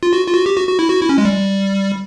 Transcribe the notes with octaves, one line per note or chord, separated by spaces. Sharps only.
F4
F#4
F4
F#4
G4
F#4
F#4
E4
F#4
E4
C#4
G#3
G3